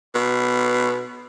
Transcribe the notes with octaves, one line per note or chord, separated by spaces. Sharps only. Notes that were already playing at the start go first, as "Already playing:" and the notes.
B2